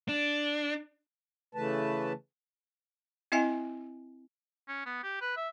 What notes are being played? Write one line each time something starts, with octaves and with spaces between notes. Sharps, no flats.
D4
C#3 E3 A3 B4 A5
C4 E4 D#5 E5 G#5
C#4
B3
G4
B4
E5